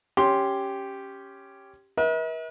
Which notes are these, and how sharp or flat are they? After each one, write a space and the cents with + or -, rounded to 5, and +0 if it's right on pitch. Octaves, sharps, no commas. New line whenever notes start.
C#4 +0 G4 +0 C6 +0
B4 -45 E5 -45